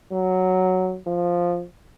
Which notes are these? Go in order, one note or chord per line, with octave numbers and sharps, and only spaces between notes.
F#3
F3